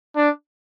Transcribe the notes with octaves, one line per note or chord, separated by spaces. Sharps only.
D4